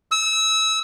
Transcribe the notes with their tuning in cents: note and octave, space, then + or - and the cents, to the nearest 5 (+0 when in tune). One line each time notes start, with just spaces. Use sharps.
E6 -25